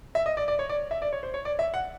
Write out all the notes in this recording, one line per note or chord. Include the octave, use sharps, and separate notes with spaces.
E5
D#5
D5
D5
C#5
D5
E5
D5
C#5
C5
C#5
D5
E5
F#5